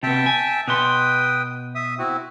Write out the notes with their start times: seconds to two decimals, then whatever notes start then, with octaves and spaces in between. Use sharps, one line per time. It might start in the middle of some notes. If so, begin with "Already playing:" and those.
0.03 C3 B3 E5 G5 A5
0.26 G#5
0.68 B2 B4 G5 C6 D#6
1.75 E5 D#6
1.98 C4 E4 F#4